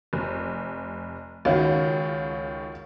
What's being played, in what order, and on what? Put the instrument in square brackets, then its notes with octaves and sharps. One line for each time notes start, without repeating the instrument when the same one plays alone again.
[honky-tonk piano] F1
[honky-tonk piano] C#2 D#3 [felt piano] F#4 C#5 F5